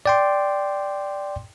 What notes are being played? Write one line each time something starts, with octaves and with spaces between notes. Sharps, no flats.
D5 G5 C6